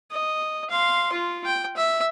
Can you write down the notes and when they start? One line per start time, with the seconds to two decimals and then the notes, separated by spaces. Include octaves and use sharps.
0.11 D#5
0.70 F5 C6
1.13 F4
1.46 G5
1.77 E5